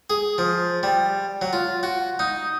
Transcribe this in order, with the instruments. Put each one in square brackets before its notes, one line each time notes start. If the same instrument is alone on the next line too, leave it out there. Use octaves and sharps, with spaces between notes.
[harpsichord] G#4
F3
G3
F#3
F4
F#4
D#4